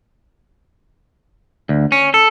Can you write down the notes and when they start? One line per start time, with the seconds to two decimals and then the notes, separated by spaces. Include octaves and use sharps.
1.69 D2
1.92 C#4
2.14 A4